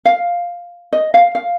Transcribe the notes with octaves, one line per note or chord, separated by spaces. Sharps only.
F5
D#5
F5
F5